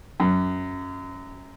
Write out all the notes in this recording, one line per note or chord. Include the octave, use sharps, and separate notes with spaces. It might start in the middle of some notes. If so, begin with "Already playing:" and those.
F#2